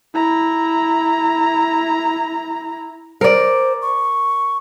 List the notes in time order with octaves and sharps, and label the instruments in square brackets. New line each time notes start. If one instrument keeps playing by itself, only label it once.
[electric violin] E4 A#5
[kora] A#4 D5 [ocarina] C5
[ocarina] C#6